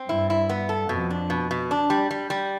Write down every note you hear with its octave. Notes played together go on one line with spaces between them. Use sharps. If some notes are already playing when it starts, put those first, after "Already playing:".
Already playing: C4
G2 E4
E4
B3
A4
F2 B2
D4
B2
B2
D4
G3
G3
G3